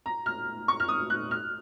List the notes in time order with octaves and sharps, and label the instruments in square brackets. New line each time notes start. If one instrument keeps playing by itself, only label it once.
[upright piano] A#5
F6
C#6
F6
D#6
F#6
F6